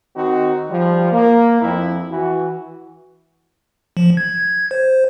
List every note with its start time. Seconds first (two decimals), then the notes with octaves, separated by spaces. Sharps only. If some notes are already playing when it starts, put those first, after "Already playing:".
0.16 D#3 C4 D#4 F#4
0.70 F3 G3
1.12 A#3
1.61 F2 E4
2.11 E3 F#4
3.97 F3
4.17 G#6
4.71 C5